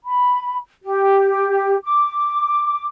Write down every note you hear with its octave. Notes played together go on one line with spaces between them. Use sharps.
B5
G4
D6